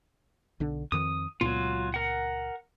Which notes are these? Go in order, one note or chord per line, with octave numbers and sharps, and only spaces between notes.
B1 D3 D4
F2 D#3 C4 D#6
C#2 A#2 F#3 B3 F4
A#4 F#5